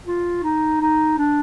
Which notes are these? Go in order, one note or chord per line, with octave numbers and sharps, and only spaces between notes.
F4
D#4
D#4
D4